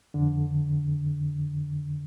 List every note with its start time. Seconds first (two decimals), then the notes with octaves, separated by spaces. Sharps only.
0.14 F2 D3